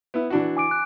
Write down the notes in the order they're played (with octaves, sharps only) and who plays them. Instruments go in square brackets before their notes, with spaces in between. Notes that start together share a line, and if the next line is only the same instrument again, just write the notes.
[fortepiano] B3 E4
E3 D4 F#4
[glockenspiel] G#5 D6 D7
F#6